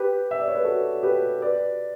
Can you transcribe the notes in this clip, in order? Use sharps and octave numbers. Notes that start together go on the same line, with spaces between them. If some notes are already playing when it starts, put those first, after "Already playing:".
Already playing: G4 B4
E5
D5
C#5
B4
F#4 A4
G4 B4
B4 D5